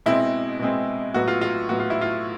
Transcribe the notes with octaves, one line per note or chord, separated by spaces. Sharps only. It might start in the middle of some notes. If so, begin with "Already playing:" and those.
B2 G#3 C4 E4
B2 G#3 C4
A2 F#3 B3 F#4
F4
F4
A2 F#3 B3 F#4
F4
E4
F4